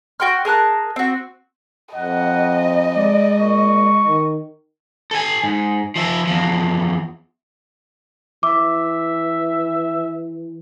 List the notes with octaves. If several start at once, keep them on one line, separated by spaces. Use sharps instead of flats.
F#4 G5 C6 F6
G#4 A#4 A5 F#6
C4 F#4
F2 D#5 F#5
G#3 D5
A#2 C#6
D#3
A4 G#5
G#2
F3 E5
E2 F3
E3 E5 D6